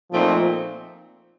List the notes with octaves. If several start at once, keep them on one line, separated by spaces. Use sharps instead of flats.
A#2 F3 A3 C4 D#4